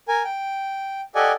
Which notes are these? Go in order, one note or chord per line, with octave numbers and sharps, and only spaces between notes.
A#4 G#5
G5
G4 A4 D5 D#5 F#5 G#5